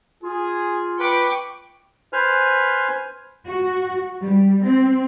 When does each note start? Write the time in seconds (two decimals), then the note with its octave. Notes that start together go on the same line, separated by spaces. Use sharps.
0.23 F4 G#4
1.00 B4 G5 C#6 D6
2.13 B4 C5 G#5 F6
3.47 F#4
4.23 G3
4.64 C4